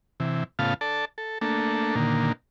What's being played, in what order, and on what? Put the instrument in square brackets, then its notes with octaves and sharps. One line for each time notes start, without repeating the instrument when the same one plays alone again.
[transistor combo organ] C3 E3
A2 C#3 B3 F4 F5 A5
A4 D5 A5
A4
A3 A#3 D4 A4
A#2 D3 D#3 A#3